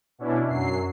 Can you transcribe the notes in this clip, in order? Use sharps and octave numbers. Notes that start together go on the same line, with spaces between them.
B2 C#4 D4 E4
F#2 F#3 C7